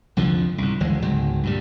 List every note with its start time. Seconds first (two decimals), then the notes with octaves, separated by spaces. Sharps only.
0.17 C2 F2 D3 F3
0.58 C2 G#2
0.80 F#1 D2 E3 G#3
1.02 G1 C#2 G#2 F#3
1.43 G2 A#2 G3